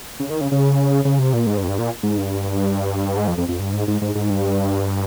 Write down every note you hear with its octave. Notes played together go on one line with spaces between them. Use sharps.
C#3
D#3
C#3
C#3
C#3
C3
A#2
G#2
G2
F2
G2
A#2
G#2
G2
G#2
F2
F2
F2
G2
G#2
G#2
G#2
G#2
G2